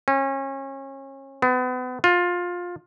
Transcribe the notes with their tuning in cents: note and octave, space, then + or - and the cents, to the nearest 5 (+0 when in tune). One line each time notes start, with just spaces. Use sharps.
C#4 -30
B3 +35
F4 +20